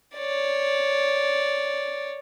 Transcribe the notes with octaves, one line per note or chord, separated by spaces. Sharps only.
C#5 D5